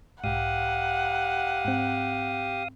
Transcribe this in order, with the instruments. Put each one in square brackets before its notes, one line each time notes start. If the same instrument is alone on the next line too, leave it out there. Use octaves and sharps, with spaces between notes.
[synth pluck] B1 G#2 [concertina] G4 [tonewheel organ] F5 D#6 [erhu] F#5
[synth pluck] G#2 C4